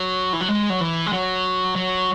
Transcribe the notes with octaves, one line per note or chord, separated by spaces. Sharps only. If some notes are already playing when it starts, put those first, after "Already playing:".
Already playing: F#3
E3
F#3
G#3
F#3
E3
G#3
F#3
F#3